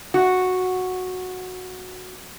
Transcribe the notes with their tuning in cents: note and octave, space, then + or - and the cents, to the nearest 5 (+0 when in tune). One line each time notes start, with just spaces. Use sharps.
F#4 -10